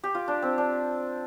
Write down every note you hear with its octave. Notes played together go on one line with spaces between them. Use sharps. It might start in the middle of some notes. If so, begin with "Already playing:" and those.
G4
F4
D4
C4
D4